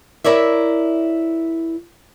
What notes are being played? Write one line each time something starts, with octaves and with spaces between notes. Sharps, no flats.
E4 A#4 C#5 D5 E5